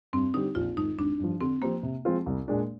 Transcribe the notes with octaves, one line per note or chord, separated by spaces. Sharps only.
G2 C4
D3 G3 C4 D#4 G4
A#1 F4
G#2 D#3 D#4
G#1 D4
G2 F3
D3 C4
F3 A#3 C4 G4 C5
C3
F3 G#3 C4 F4
C2
A#2 G#3 D4